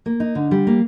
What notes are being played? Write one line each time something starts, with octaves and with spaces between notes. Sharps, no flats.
A#3
D#4
D3
G3
A#3